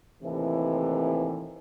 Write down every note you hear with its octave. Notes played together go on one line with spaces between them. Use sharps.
D#2 A2 C3 E3